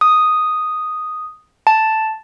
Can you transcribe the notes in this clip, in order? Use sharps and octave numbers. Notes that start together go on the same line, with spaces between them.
D#6
A5